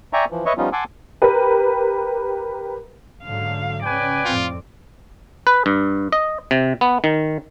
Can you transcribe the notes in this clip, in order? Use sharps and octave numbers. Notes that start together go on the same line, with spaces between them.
D5 E5 G5 G#5 A#5 C#6
E3 F3
B4 C#5 D#5 E5 C#6
F3 G3 B3 C#4 D#4 F4
F#5 G#5 A5 C6 D6 E6
G4 A#4 B4
G#2 D3 F#3 F5
C#3 C#4 B4 D5 G5 G#5
F2 A2 C4 F4
B4
G2
D#5
C3
B3
D#3